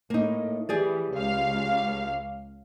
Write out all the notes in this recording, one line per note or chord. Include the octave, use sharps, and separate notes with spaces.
A2 A#3 D#4
E3 G4 G#4 D5
C#2 F5